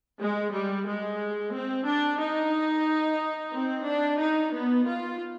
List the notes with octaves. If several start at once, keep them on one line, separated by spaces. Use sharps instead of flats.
G#3
G3
G#3
C4
D4
D#4
C4
D4
D#4
B3
F4